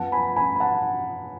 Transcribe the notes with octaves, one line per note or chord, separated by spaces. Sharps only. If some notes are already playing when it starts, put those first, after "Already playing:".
Already playing: F#2 F3 B3 F#5 A5
G#5 B5
G#5 B5
B5
F#5 A5